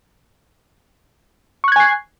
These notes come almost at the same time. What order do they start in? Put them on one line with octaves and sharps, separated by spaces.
C#6 F#6 G#6 G#5 C7